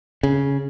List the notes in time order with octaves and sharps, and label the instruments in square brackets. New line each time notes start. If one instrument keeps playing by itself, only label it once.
[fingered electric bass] C#3